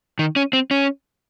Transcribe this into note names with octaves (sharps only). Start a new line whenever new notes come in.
D#3
C#4
C4
C#4